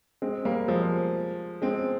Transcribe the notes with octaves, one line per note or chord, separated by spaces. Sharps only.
G#3 C4
G3 A#3
F3 G#3
G#3 C4